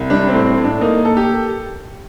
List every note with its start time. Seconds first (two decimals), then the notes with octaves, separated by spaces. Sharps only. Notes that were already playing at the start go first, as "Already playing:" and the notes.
Already playing: C2
0.10 G3 D4
0.28 C4
0.34 A2
0.46 C4
0.58 A2
0.64 D4
0.81 A#3 D#4
1.05 A4
1.17 G4